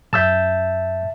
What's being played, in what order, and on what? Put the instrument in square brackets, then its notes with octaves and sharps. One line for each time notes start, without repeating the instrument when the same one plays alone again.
[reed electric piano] F#2 E6 G6 [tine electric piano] E5 A5